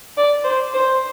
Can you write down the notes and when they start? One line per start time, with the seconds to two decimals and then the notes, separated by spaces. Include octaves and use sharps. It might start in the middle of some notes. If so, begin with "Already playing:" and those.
0.17 D5
0.45 C5
0.74 C5